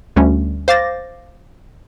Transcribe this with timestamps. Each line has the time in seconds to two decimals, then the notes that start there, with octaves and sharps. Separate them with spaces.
0.16 D2 G3 A3 C#4
0.68 C5 F5 D6 A6 A#6